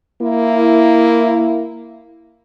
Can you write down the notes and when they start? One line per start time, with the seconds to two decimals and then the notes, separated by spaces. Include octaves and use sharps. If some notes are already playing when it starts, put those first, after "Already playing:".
0.22 A#3 E4